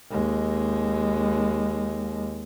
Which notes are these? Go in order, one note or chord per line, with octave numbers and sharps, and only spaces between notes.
D#2 G#3